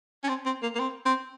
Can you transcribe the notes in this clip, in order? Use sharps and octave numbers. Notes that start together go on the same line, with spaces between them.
C#4
C4
C4
A#3
A#3
C4
C4